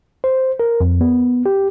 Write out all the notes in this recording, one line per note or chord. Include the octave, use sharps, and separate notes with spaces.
C5
A#4
F2
B3
G4